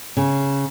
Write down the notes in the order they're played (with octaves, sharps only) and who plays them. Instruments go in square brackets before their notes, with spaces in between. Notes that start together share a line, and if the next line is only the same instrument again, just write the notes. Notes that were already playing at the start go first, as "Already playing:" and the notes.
[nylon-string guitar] C#3